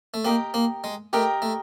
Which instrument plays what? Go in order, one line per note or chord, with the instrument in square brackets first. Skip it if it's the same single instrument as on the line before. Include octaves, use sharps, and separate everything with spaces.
[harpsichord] A3
[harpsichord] A#3 [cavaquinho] G4 A#4 D#5 G5
[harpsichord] A#3
G#3
[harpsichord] A3 [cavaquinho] G4 A#4 D#5 G5
[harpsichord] A3